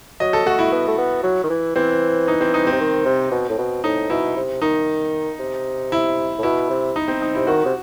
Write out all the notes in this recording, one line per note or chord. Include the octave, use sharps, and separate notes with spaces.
F#3 D#5
A4
A3 F#4
E4
B3
A3
B3
F#3
D#3
E3
E3 C4
D#4
C4
D#4
C4
C3
D#3
C3
B2
A2
B2
A2 D#4
B2 E4
C3
D#3 D#4
C3
E4
A2
B2 E4
C3
D#4
C4
D#4
C3 E4
D#3 F#4
C3